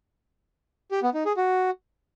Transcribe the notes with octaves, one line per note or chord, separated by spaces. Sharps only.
G4
B3
D#4
G#4
F#4